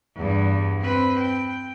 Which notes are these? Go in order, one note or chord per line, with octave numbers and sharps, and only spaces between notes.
E2 G2
C4 B4
G5